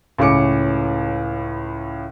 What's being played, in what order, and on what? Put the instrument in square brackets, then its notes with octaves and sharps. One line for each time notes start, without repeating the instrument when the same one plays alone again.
[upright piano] C#2 A2 C#4 D6 C#7